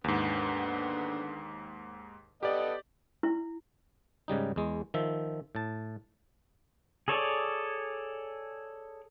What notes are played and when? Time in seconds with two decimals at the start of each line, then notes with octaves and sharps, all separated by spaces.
0.04 D#2 G#2 D3 B3
2.43 B3 G4 A4 D5 D#5
3.23 E4
4.28 G#2 C#3 G3 D#4
4.56 E2 G#3
4.94 D#3 F3 E5
5.55 A2 A5
7.08 G#4 A4 C#5 D5